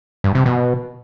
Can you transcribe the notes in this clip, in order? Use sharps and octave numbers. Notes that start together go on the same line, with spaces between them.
G2
C3
B2